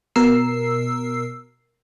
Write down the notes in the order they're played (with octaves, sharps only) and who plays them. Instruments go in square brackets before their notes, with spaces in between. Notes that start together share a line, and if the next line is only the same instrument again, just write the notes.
[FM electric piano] B2 A#4 E6 C7